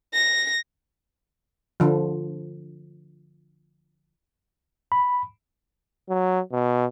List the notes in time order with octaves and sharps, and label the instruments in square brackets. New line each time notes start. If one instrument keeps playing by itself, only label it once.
[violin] A#6
[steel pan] D3 F3
[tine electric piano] B5
[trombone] F#3
B2